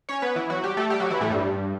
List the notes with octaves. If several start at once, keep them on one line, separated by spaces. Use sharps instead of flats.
C#4 C#5
B3 B4
E3 E4
F#3 F#4
G3 G4
A3 A4
G3 G4
F#3 F#4
E3 E4
A2 A3
G2 G3